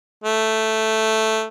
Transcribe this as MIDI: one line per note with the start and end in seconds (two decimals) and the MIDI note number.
0.24 1.45 57